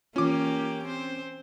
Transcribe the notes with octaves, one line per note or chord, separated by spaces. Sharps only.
E3 A#3 C#4 F4 G4 D6
C4 C5